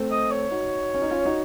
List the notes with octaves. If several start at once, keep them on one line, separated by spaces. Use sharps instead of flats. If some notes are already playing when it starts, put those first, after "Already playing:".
Already playing: A3 C4
D#5
C#5
D#4 F#4
C#4
D#4
C#4 F4
D#4 F#4